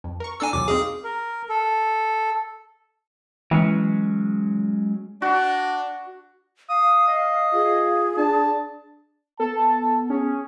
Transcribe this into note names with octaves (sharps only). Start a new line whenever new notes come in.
F2
A#4 C#6
D4 A4 A#4 G#5 E6
B1 E2 F#3 D6
C4 D#4 G#4 F5
A#4
A4
E3 F#3 G#3 C#4
D4 F#4
F5 D#6
D#5
F4 G#4
D4 A5
B3 A4 A5
C#4 G#4